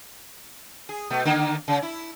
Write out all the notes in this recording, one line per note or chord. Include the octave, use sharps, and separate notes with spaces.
G#4
B2 A3
D3 D#3 A#3
C#3
E4